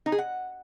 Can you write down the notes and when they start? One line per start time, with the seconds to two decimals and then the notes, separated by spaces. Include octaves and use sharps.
0.06 D#4
0.12 G#4
0.18 F#5